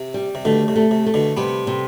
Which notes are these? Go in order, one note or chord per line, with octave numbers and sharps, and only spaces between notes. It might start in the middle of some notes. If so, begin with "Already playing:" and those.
Already playing: C3
G3
C3
B2 D3 A3
C3
A3
C3
A3
B2 D3
C3 G3 B3
C3